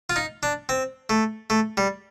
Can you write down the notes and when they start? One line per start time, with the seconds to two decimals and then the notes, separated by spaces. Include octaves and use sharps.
0.10 F4
0.16 D#4
0.43 D4
0.69 C4
1.10 A3
1.50 A3
1.77 G3